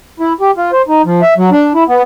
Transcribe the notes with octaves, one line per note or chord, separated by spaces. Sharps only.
E4
G4
F4
C5
D#4
F3
E5
F#3
D4
E4
B3